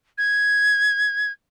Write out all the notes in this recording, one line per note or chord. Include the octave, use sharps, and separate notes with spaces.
G#6